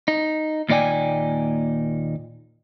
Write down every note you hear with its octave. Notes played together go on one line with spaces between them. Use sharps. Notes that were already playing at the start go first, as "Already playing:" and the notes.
D#4
D#2 A#2 D#4 D5 G5 G#5